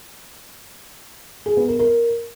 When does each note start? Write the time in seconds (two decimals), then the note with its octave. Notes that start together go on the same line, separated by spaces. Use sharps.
1.46 G#4
1.57 B3
1.68 A#4
1.79 A#4